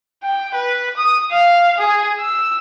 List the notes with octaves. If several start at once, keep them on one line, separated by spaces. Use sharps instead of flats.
G5
B4
D#6
F5
G#4
E6